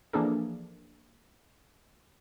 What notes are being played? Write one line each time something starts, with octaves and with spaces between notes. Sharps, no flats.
E3 F3 A#3 D4 G#4 A4